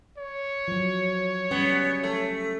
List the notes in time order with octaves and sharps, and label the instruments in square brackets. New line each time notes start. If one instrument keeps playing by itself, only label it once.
[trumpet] C#5
[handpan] F3 F#3
[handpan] G3 C#4 [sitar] B3
[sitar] A3